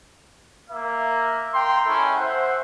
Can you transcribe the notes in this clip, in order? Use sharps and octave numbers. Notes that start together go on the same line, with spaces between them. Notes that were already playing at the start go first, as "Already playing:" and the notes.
A#3 E5
A#3 G5 A#5 C6
G#3 C#4 E4 A4
C5 E5 F#5